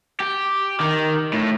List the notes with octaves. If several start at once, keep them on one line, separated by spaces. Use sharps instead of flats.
G4
D#3
A2